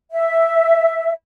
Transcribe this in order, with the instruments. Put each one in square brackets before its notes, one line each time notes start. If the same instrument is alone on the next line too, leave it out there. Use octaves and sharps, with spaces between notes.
[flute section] E5